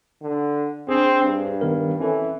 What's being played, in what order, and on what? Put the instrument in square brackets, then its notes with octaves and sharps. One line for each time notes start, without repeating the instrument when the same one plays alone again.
[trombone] D3
[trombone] C4 [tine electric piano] D4 G#4 C5
[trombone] G2
[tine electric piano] D#3 B3 A#4
[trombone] E3 [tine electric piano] C4 C#4 A4